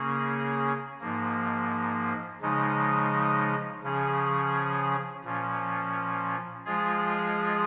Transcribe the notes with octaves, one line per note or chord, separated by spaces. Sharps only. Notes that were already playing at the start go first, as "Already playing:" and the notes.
Already playing: C#3 A#3 C#4 G#4
G#2 F3 A#3
C#3 F3 G#3 D#4
C#3 F3 C#4 G#4
A#2 F3 C#4
F3 G#3 F4 G#4